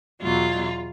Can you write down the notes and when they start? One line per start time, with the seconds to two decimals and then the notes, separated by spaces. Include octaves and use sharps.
0.21 E2 B2 F#3 F4